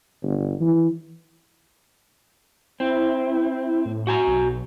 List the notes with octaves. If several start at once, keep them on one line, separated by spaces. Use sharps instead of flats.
G1
E3
C4 E4
A2
F#4 G#5 A#5
B1